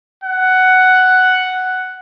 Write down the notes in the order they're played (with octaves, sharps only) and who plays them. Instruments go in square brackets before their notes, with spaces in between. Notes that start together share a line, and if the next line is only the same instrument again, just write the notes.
[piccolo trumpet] F#5